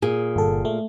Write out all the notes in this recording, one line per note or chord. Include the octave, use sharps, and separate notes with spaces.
A#2 G#4
G1 A4
A3